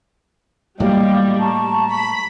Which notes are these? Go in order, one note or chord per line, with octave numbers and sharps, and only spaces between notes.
A2 F#3 G3 A#3 D#5 F5 G5
A5 A#5 C#6
B5